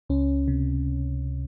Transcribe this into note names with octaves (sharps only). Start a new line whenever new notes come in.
C#2 C#4
C3